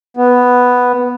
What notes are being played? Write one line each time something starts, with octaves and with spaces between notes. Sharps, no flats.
B3